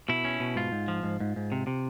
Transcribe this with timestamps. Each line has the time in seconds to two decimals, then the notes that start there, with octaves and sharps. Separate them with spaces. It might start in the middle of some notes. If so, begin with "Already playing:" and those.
0.09 B2 E4
0.24 C#4
0.40 B2
0.56 G#2 F4
0.72 G#2
0.88 F3
1.03 G#2
1.20 G#2
1.36 G#2
1.52 C3
1.67 C3